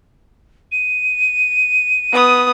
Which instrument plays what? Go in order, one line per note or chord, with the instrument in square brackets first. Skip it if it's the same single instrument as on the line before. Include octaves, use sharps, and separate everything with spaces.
[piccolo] D#7
[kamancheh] B3 D#6